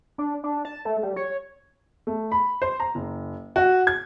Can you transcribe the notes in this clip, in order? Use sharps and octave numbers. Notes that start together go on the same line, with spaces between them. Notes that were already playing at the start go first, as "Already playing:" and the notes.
D4
D4
A5
A3
G3
C#5
A3
B5
C5
A#5
F#1
F#4
G#6